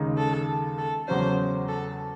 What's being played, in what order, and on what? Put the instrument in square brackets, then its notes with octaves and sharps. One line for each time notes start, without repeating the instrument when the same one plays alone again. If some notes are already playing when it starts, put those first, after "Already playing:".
Already playing: [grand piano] D#2 C#3 G#3 D#4
[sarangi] A4
A4
[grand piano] E2 C#3 F#3 C#4 [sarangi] C5
[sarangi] A4